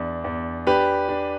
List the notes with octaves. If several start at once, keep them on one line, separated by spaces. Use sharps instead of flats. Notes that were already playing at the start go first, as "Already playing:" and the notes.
Already playing: E2 D4
E2
D4 G4 B4
D4